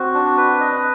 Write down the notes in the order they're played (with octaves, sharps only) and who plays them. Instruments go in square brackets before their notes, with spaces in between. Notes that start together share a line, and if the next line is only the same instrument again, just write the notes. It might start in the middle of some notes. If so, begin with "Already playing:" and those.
Already playing: [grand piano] C4 [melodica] F#4
[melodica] D4
B4
D#5